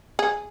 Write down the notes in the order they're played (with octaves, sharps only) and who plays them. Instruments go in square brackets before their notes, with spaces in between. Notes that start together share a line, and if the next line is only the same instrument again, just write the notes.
[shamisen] G#4